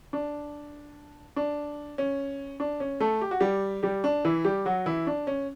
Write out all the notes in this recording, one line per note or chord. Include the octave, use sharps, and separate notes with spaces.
D4
D4
C#4
D4
C#4
A3 A4
G4
F#4
G3 G4
G3 G4
D4
E3 E4
G3 G4
F#3 F#4
E3 E4
D4
C#4